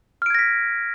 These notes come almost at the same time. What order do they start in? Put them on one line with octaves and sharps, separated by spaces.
F6 D7 G#6 A#6 B6